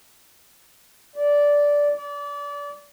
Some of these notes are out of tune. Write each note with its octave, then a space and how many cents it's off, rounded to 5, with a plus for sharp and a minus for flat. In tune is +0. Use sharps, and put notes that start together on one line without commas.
D5 -10
D5 -30